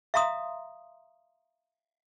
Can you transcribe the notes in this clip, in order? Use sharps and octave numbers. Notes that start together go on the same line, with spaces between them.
E5 F5 A#5 C6 D#6